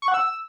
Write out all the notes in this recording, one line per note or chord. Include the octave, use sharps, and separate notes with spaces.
C#6
F#5
E6